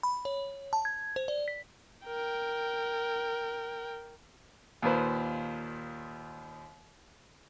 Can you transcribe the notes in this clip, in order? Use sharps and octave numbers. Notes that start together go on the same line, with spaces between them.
B5
C#5
A5
G#6
C5
D5
B6
A#4 G5
D#2 A#2 D#3 B4 C5